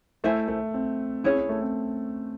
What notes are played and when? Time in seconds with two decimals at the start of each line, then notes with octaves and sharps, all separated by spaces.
0.24 A3 E4 C5 E5 G#5
0.48 A3
0.74 C4
1.24 C#4 E4 G#4 C#5
1.36 C#4
1.49 A3
1.61 C4